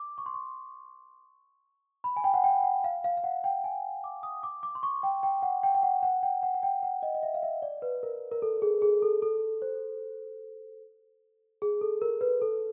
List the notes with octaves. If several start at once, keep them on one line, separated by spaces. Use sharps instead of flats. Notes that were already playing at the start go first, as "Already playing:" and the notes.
Already playing: D6
C#6
C6
C#6
B5
G#5
G5
F#5
G5
F#5
F5
F5
F5
F#5
G5
G#5
D6
D#6
D6
D6
C6
C#6
G5
G5
F#5
G5
G5
F#5
F#5
G5
F#5
F#5
G5
F#5
D#5
D#5
E5
F5
E5
D5
B4
A#4
A#4
A4
G#4
G#4
A4
A4
C5
G#4
A4
A#4
B4
A4